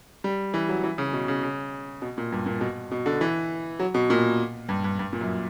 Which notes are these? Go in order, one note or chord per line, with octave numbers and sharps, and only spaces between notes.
G3
E3
F#3
E3
C#3
B2
C#3
C#3
B2
A#2
G2
A#2
B2
B2
D3
E3
F#3
B2
A#2
G2
G2
G2
A#2
F#2